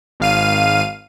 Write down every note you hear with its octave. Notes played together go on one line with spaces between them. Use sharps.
G#1 F5 D#7